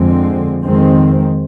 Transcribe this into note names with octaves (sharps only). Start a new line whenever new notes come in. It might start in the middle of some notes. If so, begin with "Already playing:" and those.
Already playing: F2 D3 G#3 C4
F2 D#3 G#3 C4